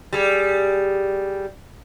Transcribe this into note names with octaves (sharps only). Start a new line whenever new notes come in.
G3 G#4